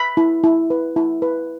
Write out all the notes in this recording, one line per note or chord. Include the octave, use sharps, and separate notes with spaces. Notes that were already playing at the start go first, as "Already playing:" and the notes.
Already playing: B5
E4
E4
B4
E4
B4